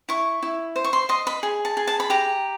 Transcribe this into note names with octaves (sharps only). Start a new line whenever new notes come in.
E4 C#6
E4
C5
C#6
C6
D#5 C6
B5
G#4
A5
G#4
A5
B5
G4 A#5